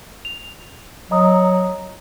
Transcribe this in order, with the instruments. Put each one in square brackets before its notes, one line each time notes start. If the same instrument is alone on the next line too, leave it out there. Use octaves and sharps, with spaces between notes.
[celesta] F7
[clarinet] F#3 [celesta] D#5 A#5 D#6